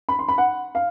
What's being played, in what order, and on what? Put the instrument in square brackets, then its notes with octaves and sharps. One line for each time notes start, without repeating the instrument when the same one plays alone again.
[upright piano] B5
C6
B5
F#5
F5